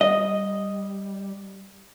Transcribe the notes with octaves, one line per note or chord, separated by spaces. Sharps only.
G3 D#5